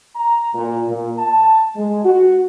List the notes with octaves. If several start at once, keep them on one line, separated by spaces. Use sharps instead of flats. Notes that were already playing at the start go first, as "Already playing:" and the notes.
A#5
A#2
A#2
A5
G#3
F#4